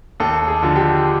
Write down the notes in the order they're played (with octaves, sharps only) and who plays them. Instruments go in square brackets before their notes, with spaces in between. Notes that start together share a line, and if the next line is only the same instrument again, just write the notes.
[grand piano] D#2 A4
G#4
D3 F3
G4